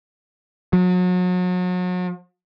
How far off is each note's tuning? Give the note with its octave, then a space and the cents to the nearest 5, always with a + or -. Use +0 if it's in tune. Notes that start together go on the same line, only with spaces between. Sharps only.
F#3 -35